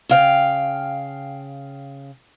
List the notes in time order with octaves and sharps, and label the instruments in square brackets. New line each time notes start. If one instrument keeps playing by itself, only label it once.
[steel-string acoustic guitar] C#3 F5 G5